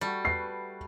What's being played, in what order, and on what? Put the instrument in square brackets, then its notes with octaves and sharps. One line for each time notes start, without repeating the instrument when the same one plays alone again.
[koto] G3 [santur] A3 F#4
[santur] B4 [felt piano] C7